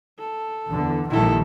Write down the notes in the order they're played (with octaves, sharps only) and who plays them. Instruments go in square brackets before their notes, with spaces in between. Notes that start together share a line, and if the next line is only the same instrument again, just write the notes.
[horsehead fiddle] A4
[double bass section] E2 D3
[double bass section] A#1 D#3 G3 [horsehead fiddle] E4 A4